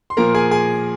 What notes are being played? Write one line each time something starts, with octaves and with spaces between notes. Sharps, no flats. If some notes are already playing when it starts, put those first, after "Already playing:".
C6
A#2 F3 A#3 A#4 A#5
G#4 G#5
G#4 G#5